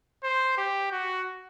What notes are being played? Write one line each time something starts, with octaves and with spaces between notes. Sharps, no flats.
C5
G4
F#4